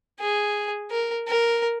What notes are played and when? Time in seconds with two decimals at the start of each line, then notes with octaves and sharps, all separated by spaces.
0.20 G#4
0.91 A#4
1.27 A#4